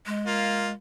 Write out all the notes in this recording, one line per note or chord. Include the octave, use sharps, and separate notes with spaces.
G#3
A#3 F4